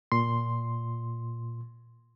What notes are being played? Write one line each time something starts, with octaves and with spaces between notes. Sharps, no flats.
A#2 C6